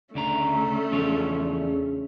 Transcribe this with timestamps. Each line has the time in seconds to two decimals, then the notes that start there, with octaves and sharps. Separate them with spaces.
0.15 D2 C#3 A3 C#4 D4 A#5
0.92 E2 C#3 F3 C#5